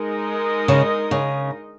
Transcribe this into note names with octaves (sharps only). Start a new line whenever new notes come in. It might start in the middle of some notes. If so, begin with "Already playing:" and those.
Already playing: G#3 D#4 A#4 D#5
C#3
C#3